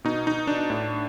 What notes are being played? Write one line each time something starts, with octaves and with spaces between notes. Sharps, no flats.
B2 D#4
D#4
D4
A2